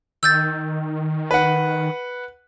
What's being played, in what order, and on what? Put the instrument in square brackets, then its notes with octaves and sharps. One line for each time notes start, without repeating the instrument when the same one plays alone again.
[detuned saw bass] D#3 [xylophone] E6 G6 A6
[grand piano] B4 F#5